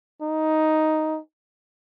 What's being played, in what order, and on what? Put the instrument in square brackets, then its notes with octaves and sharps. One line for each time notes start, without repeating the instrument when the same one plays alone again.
[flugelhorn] D#4